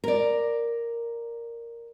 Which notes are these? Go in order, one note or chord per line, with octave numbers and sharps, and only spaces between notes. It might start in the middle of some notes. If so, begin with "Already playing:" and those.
A#4 D5